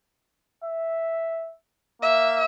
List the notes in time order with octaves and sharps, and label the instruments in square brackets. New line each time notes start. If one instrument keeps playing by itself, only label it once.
[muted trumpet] E5
[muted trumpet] A#3 [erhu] E5